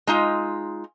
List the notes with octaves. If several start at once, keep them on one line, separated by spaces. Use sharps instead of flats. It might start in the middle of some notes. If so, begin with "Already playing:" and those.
G#3 D#4 F4